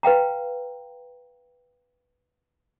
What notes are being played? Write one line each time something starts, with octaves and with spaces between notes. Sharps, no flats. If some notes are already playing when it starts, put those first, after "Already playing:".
B4 F5 G5 A#5